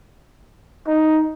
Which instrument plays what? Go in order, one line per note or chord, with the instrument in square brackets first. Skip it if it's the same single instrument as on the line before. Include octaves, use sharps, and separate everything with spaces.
[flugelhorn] D#4